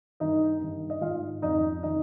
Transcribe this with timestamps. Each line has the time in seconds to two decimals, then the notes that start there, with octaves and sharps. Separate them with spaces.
0.20 G2 D#3 D#4 D#5
0.60 G2 D#3
0.90 D#5
1.01 G#2 D#3 F4 F5
1.42 F2 C#3 D#4 D#5
1.83 D#3 D#4 D#5